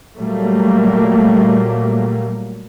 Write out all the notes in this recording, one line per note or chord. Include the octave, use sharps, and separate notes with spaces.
A#2 F#3 G3 A3 A#3